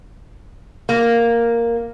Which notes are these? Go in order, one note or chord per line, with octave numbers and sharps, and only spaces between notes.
A#3